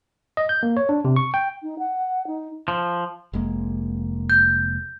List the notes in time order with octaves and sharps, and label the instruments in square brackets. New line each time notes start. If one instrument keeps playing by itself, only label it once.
[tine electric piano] D#5
G6
A#3
C#5
D4
C3
C#6
G5
[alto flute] D#4
F#5
D#4
[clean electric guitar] F3
[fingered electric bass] F1 G#3 A#3
[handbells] G6